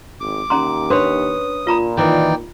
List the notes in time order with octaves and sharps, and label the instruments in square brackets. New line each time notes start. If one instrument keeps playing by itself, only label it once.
[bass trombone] G#1 [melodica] D6
[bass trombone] D#2 [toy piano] C#4 A#5 C6
[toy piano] D4 C6 [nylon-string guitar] B4 C#5 [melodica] D#6
[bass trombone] A#2 [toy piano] F4 A#5 B5
[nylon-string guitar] D#3 E3 [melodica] D#4 D5 G5